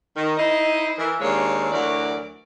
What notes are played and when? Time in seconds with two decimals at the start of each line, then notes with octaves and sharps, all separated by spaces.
0.16 D#3
0.37 D#4 E4 C5 D#5
0.98 E3 A#4
1.21 D#2 G#3 C4 D4 C#5 F5
1.72 D2 E3 F#3 A#4 D5